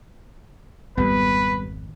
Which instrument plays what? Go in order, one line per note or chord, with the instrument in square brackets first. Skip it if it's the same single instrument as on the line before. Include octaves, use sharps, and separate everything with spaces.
[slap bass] G#1 F2 [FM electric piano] G3 B3 [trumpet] B4